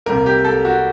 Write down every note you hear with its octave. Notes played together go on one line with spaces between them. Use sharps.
C2 C3 G3 A#3 A#4
G4
A4
F#4